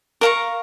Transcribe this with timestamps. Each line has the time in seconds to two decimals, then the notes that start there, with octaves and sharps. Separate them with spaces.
0.21 A#4 F5 A#5 C#6